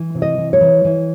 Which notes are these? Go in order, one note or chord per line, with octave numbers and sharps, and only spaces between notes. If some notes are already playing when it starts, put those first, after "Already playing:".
Already playing: E3
C3
D#5
E3
C#5
E3
E3